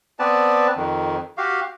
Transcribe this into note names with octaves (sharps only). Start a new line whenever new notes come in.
B3 C4 B4 D5 A5
F2 D#3
F#4 G4 F5